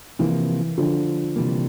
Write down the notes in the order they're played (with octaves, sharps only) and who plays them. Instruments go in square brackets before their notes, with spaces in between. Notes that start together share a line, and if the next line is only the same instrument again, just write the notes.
[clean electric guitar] C3 F3 A#3 [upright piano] E3
[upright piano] D3 F3
[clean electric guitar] C3 E3 G3 A#3